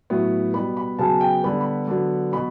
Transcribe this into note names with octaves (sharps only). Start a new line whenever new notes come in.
A2 F#3 B3
B2 G3 B3 B5
B5
C#3 F#3 B3 A5
G5
D3 G3 B3 B5
B5
D3 F#3 B3
B2 F#3 B5